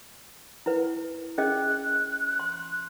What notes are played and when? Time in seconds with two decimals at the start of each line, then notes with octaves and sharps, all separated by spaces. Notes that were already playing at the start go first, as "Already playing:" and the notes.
0.66 E4 B4
1.38 C#4 G#4 D#5 F#6
2.39 C6